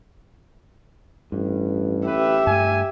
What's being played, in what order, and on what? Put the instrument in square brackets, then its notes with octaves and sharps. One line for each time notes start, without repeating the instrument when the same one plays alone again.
[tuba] A1 [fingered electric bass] G2
[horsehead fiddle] G4 E5 [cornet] B4
[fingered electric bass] G2 A3 [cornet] G#5